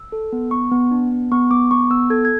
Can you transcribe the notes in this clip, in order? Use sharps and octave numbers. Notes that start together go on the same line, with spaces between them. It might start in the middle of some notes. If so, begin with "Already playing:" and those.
Already playing: E6
A4
B3
B3 C#6
B3
D4
B3
B3 C#6
B3 D6
B3 C#6
B3 E6
A4 G#6
G#6